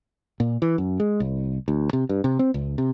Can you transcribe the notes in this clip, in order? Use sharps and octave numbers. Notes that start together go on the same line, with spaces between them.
A#2
E3
F#2
G#3
C2
D2
C3
G2
C3
C4
C#2
C3